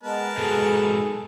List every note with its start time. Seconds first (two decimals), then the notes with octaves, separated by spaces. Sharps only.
0.03 G#3 B3 A#4 B4 A5
0.38 G#2 B2 G#4 A4